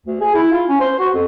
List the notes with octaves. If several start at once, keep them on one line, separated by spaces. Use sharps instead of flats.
D2
G#4
E4
F4
C#4
C5
F#4
F2